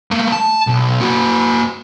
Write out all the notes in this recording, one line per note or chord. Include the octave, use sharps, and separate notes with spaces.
A3 A#3
A5
B1
A#3 F#4